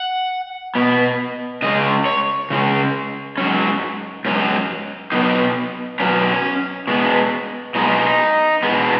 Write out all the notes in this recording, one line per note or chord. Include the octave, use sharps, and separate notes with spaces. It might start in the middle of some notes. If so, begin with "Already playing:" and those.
Already playing: F#5
B2 B3
C#3 G#3 C#4 D#5
C#5
C#3 G#3 C#4
G#2 F#3 C#4
G#2 F#3 C#4
B2 F#3 B3 D#4
B2 F#3 B3 C#4
B2 G#3 B3
B2 G#3 B3 D#4
B2 G#3 B3